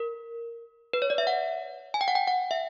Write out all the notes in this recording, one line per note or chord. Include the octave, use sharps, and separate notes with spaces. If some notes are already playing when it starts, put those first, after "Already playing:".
Already playing: A#4
B4
C#5
D5
E5
F#5
G#5
G5
F#5
G5
F#5
E5